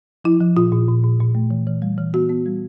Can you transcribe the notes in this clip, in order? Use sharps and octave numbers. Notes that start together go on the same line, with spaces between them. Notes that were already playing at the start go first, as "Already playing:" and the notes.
F3 E4
F3
A#2 F4
A#2
A#2
A#2
A#2
A3
E3
E3
G3
E3
B3 F#4
B3
G3